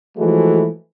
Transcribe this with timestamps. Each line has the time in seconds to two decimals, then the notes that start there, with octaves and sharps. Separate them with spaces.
0.17 E3 F3 G#3 A3 F#4 A4